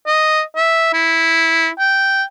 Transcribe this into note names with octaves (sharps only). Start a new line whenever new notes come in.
D#5
E5
E4
G5